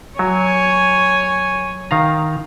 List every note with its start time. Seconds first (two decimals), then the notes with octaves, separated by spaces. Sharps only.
0.19 F#3 C#5 G#5
1.91 D#3 F5 A#5